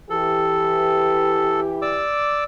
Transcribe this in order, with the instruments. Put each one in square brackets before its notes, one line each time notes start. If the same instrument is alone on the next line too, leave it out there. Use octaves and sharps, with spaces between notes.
[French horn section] E3 G4 [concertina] A4
[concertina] D5 D6 E6